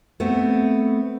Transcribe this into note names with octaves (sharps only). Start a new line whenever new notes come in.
A3 B3 C4